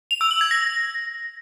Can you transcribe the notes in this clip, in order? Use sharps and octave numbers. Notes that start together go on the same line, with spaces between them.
F7
E6
F#7
G#6
A#6